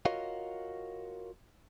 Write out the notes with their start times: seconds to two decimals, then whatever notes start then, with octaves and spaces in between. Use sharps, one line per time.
0.05 F4 F#4 A#4 C#5 D#5 F5